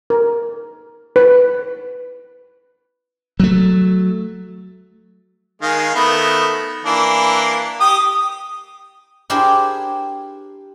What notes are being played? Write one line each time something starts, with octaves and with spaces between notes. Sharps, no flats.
A#4
B4
F#3 A3
D#3 G#3 F5
D#3 A3 B3
E3 A#3 D4
G4 D#6
D4 E4 G4 G#4 A#4 C5